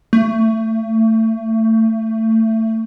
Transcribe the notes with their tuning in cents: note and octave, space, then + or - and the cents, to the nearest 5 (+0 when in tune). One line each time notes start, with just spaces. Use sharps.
A3 +30